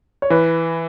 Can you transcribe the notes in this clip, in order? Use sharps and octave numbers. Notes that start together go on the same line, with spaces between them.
C#5
E3 B4